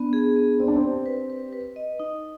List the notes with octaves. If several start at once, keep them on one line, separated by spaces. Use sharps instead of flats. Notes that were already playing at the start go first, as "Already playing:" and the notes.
Already playing: B3 D4
G#4
B3
C4 D5
D4
C4
G4
B4
B4
B4
D#5
D#4